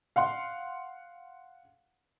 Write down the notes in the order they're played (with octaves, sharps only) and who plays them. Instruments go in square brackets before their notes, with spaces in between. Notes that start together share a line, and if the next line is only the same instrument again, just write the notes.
[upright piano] F5 F#5 C6